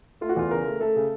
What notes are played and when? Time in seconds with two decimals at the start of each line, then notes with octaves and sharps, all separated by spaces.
0.21 A3 F4
0.29 F#4
0.36 E2 F4
0.51 C#3 A#4
0.66 A3
0.80 A3 A4
0.96 C#3